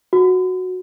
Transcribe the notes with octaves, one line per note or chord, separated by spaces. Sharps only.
F#4